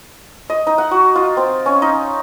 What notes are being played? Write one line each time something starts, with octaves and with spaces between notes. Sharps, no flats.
D#5
D#4
F#5
F#4
F4
C4
C#4
D#4